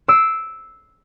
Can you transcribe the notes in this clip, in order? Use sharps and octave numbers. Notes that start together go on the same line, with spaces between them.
E6 C7 D7